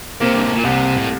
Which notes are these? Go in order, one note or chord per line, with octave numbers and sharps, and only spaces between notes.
C3 A#3
G2
A2
A#2
C2 C3
A2